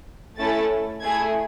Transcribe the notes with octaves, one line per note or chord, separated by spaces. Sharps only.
A3 C#4 E4 A4 A6
A3 E4 G#4 G#6